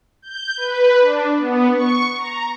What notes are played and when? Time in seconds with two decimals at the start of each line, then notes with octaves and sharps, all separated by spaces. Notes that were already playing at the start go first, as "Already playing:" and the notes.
0.22 G6
0.57 B4
1.01 D4
1.38 B3
1.73 C#6
2.17 A#5